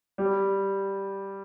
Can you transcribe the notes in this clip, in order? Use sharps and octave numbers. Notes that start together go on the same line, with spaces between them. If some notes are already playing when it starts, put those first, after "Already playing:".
G3